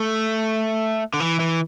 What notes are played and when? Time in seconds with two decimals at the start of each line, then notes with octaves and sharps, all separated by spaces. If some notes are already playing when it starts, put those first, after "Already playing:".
Already playing: A3
1.14 D3
1.20 E3
1.40 E3